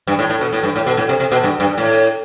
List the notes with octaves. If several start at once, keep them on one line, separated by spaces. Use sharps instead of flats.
G2
A2
A2
B2
A2
G2
A2
B2
A2
C3
C3
B2
G2
G2
A2